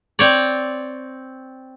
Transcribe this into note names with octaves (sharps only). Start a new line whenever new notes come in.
C4 C#5 D5